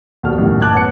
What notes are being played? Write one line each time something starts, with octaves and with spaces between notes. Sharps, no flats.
D#2 B2 G3 A4 F6
A1 F#2 A2 C3 D#3
A5 D6 F#6 G#6
B3 C#5 C#7